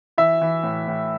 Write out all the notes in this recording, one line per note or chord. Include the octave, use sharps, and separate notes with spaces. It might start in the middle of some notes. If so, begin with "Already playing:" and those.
E3 E5
E3
A2
A2